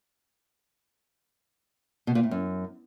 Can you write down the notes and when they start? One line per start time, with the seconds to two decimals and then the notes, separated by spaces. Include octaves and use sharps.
2.07 B2
2.15 A#2
2.23 A2
2.31 F#2